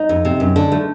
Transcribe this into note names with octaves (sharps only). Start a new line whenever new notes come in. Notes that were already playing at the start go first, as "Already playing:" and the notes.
Already playing: D#4
F2
C3
F#2
D3
A3